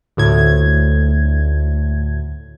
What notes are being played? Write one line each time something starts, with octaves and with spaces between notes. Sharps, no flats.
D2 A2 G#6